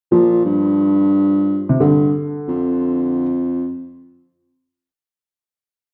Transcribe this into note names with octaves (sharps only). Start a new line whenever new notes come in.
A#2 F3
G2
C3
G2 D3
F2